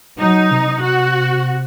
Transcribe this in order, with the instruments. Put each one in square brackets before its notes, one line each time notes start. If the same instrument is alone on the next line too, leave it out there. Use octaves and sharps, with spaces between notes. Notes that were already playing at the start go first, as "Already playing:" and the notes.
[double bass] F#3 [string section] D#4
[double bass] C3
[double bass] C3 [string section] F#4